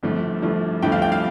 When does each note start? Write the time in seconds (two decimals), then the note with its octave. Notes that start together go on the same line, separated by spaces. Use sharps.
0.03 G1 G2 F3 A3
0.42 G1 G2 F3 A3
0.82 G1 G2 F3 A3 G5
0.92 F5
1.02 G5
1.12 F5